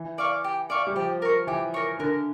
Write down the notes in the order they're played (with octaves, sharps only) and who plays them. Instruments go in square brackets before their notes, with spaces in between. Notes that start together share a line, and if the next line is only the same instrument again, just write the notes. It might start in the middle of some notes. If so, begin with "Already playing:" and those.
Already playing: [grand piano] E3
[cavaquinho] D5 F5 C#6
G4
D5 F5 C#6
[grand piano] G3
[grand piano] F3 [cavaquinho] G4
[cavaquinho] A#4 C#5
[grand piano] E3 [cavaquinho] G4
[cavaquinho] A#4 C#5
[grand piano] D3 [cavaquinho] A#4